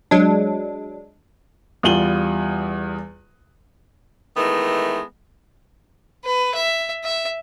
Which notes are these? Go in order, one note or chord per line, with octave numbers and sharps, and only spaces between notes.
F#3 G#3 D4
E2 G3 F4 D#7 F#7 G7
D#3 E3 G#3 A3 B3
B4
E5
E5